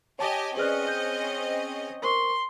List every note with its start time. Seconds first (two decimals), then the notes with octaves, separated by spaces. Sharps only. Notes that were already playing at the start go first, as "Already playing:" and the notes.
0.19 G4 C#5 D#5 G#5 A5 D6
0.57 C4 C#4 G#4 B4 D5 D#5 F6 F#6
0.88 G6
2.02 A#4 C5 C6 C#6